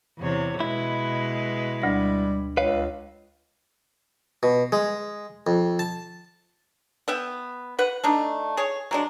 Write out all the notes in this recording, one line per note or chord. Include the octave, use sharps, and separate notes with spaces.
E2 C3 C#5
B2 G#3 E4 B4
D2 G3 A#6
C#2 B4 C#5 F5
B2
G#3
F2
A5
B3 E5 G5
B4 F#5
A3 D4 D#4
G#4 C#5
F#3 G#3 D4